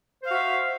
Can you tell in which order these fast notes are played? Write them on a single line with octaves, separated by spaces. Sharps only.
C5 F5 F#4 E5